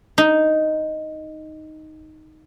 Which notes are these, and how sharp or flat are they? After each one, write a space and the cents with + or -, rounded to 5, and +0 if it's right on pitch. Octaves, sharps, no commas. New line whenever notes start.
D#4 +0